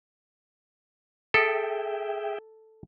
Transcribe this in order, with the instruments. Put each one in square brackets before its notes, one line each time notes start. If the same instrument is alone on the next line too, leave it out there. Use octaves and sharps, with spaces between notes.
[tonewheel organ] G#4 E5 G5 [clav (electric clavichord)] A4